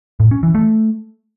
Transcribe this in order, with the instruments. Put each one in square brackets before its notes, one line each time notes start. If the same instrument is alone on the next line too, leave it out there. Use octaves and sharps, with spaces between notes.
[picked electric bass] A2
C#4
E3
A3